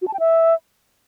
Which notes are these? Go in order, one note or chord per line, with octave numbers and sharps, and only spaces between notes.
F#4
A5
G5
E5